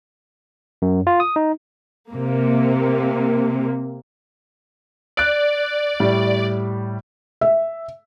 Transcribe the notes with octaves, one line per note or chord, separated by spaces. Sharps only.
F#2
F4
D#6
D#4
C3 A#3
D5 F#6 D7
A2 G3
E5